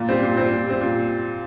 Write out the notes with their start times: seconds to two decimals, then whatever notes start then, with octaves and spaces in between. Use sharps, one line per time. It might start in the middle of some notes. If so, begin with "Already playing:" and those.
Already playing: A#2
0.09 G3 C4
0.23 A#2
0.37 G3 C4
0.52 A#2
0.67 G3 C4
0.81 A#2